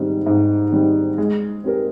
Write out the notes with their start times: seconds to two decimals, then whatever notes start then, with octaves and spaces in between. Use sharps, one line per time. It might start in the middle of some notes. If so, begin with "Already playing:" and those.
Already playing: G#2 D#3 G3 C4
0.26 G#2
0.72 D#3 G3 C4
1.18 G#3
1.64 C4 G4 A#4